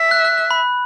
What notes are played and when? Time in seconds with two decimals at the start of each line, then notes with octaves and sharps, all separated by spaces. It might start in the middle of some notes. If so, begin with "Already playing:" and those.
Already playing: E5
0.11 F#6
0.25 F#6
0.38 F#6
0.51 B5